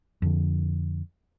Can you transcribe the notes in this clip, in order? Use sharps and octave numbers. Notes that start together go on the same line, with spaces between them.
F2 D3